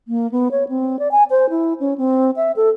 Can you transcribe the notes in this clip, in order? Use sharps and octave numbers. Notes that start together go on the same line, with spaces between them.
A#3
B3
C#5
C4
D5
G#5
C5
E4
C#4
C4
E5
A4